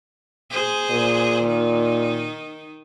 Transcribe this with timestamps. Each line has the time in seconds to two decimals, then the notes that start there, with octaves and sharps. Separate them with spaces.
0.51 G#4 C5
0.91 A#2
1.44 D#3 D#4